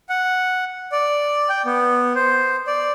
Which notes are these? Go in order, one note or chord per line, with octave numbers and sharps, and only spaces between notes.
F#5
D5
G5
B3
C5
D5